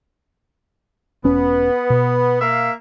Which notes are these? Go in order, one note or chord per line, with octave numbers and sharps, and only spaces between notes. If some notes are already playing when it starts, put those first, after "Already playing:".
E1 B3 C#4
B2
A#3 E5 F5